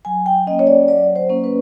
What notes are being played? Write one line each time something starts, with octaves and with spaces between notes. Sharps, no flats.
F#3 G#5
G5
A#3 C#4 D#5
C#5
D5
F#3 D5
C5
A#3 C#4
B4